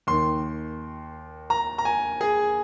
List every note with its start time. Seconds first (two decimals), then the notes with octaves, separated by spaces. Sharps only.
0.07 D#2 D#3 C6
1.50 A#5
1.78 A#5
1.85 G#5
2.21 G#4